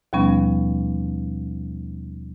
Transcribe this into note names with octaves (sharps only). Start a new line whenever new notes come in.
D#2 B2 F3 G3 B3 C#4